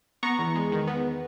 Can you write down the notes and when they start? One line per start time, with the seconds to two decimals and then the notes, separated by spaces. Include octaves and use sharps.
0.23 B3 A#5 C#6
0.39 E2
0.56 G#3
0.72 D#3
0.87 B3